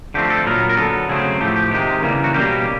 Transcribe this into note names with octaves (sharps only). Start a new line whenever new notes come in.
D3 F3 A3 C4 G4
A4
A#2 F#3 B3 A#4
A#4
D3 F#3 B3 A4
C#3 F#3 A3 C4 G#4
A2 F3 A3 G4
G4
C3 D#3 G#3 G4
C#3 E3 G3 A#3
F#4
B2 G3 A#3 C#4 G4